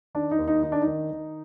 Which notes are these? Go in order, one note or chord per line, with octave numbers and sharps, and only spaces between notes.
D#3 D4
D#4
D#2
D#4
D#3 D#4
D4
D#4
D#3
D#3